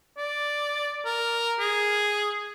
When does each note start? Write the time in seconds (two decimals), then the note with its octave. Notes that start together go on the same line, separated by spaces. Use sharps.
0.17 D5
1.05 A#4
1.60 G#4